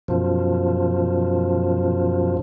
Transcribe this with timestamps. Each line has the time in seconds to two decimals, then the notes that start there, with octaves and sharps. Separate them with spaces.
0.08 F#2 B2 F3